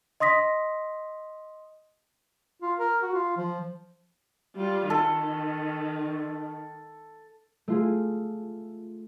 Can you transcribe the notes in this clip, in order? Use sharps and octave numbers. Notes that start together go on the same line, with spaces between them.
D#5 C6 D#6 A#6 B6
F4
A#4
F#4
F4
F3
G3 F4
D#3 A4
A3 F4 G#4